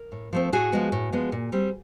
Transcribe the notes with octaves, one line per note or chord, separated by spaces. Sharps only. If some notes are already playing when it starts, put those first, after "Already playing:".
Already playing: A#4
A2
F3 A3 C4
A2 F#4 G#4
F3 G#3 B3
A2
F3 G#3 B3
A#2
G3 C4